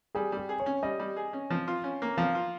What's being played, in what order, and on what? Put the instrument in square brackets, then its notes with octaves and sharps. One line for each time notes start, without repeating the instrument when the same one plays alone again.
[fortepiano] G3 [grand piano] G#4
[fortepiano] G3
[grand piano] G4
[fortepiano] G#4
[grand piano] C#5
[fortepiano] C#4
[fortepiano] G3 [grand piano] D#5
[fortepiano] G3
G#4
C#4
F3
F4
C#4
A#3
[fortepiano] F3 [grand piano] F5
[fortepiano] F4